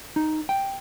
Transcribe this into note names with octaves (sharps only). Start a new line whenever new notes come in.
D#4
G5